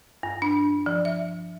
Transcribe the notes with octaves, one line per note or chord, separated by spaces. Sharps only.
G2
D4
F3
E5